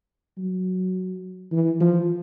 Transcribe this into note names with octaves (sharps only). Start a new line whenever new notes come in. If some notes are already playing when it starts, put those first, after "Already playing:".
F#3
E3
F3